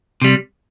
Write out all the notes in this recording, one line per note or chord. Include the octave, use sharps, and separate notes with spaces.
C3 G3